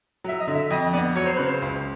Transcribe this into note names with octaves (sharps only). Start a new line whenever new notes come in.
F#3 E5
D#5
D3
E5
F2 D#5
B3 D5
F#3 C#5
C5
C#3 B4
C5
C#2